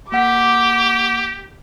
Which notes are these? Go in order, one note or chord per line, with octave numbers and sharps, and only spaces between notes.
A#3 G4 F#5 D6 B6